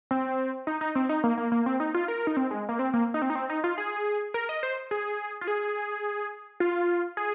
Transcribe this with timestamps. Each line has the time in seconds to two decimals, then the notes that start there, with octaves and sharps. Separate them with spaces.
0.11 C4
0.67 D#4
0.81 D#4
0.95 C4
1.09 D#4
1.24 A#3
1.38 A#3
1.52 A#3
1.66 C4
1.80 D#4
1.94 F4
2.08 A#4
2.27 D#4
2.37 C4
2.51 G#3
2.69 A#3
2.79 C4
2.93 A#3
3.14 D#4
3.22 C4
3.30 D#4
3.35 C4
3.50 D#4
3.64 F4
3.78 G#4
4.34 A#4
4.49 D#5
4.63 C5
4.91 G#4
5.41 F4
5.47 G#4
6.60 F4
7.17 G#4